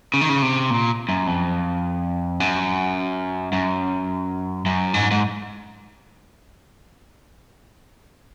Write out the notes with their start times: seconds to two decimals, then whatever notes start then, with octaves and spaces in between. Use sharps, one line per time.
0.14 C#3
0.21 D#3
0.29 C#3
0.42 C3
0.70 A#2
1.09 F#2
1.27 F2
2.40 F#2
3.53 F#2
4.66 F#2
4.94 G#2
5.11 G#2